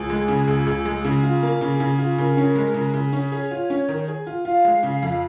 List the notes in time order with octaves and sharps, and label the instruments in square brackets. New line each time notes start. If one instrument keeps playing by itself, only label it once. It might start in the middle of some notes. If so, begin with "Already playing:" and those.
Already playing: [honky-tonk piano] C#2 [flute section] G#4
[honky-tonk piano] G#3
C#3
C#2
C#2
G#3
C#3
F4
A#3
[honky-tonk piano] C#3 [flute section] G#4
[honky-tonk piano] C#3
F4
[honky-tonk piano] C#3 [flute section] A#4
[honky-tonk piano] C#4
G#3
C#3
C#3
C#4
[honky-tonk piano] G#4 [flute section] C#5
[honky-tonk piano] F4
C#4
D#3
G#4
F4
[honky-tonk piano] F4 [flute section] F5
[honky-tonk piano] G#3
C#3
F2